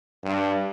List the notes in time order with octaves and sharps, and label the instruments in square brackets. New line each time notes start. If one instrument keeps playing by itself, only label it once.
[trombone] G2